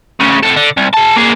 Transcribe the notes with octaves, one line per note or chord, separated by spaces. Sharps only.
D2 C#3
C3 A4
D3
C2
G#4 A5
A#3 G#4